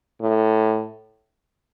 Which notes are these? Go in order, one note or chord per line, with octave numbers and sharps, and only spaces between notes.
A2